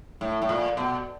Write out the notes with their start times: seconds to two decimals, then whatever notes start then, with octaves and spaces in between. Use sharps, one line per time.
0.21 A2
0.42 A2
0.49 A#2
0.77 B2